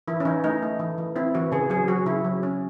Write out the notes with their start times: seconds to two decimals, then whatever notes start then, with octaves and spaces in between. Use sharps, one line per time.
0.08 E3 E4
0.20 C#4
0.25 E3 D#4
0.44 A3 D#4
0.62 A3
0.79 E3
0.98 E3
1.16 C4 E4
1.34 E3 F#4
1.52 C#3 G#4
1.70 F#3 G#4
1.88 F#3 F#4
2.06 C#3 E4
2.24 F#3
2.43 C#4